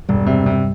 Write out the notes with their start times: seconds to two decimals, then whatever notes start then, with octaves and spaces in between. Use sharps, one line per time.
0.09 E1 G2 G3
0.27 C3
0.46 C3